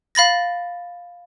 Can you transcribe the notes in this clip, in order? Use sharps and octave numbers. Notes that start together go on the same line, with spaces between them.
F5 B5 A6 A#6